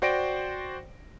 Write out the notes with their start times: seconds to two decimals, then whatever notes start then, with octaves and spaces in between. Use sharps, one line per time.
0.02 F#4 C5 D5 G5 A#6 D7